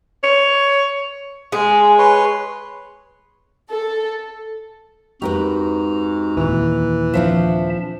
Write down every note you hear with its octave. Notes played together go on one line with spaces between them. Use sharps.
C#5
G#3 G#4
B4 C#5 C6
A4
F2 G#2 F#4 G4 A#4 B4 A#5
D#2 A#2 E3
F3 C4 D4 E5 A5